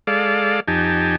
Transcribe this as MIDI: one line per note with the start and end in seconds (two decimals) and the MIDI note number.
0.07 0.60 56
0.07 0.60 69
0.07 0.60 74
0.07 0.60 77
0.68 1.16 41
0.68 1.16 63
0.68 1.16 67
0.68 1.16 80
0.68 1.16 81